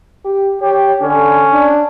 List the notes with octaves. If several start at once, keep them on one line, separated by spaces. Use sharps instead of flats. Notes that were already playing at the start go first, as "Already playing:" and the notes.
G4
G4 C#5
D3 C#4
D4